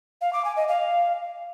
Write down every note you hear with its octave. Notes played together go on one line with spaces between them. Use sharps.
F5
D6
G#5
D#5
F5